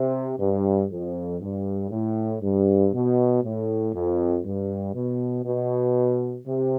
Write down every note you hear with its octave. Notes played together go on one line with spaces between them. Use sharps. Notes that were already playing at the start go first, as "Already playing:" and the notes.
Already playing: C3
G2
F2
G2
A2
G2
B2
A2
F2
G2
B2
B2
C3